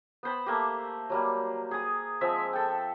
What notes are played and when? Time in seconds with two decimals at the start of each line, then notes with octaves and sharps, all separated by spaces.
0.23 B3 C5 B5
0.46 A3 A#3 G4
1.10 F#3 G3 A#3
1.71 G#4 D#6
2.21 F3 G#3 C4 E5
2.53 A4 G5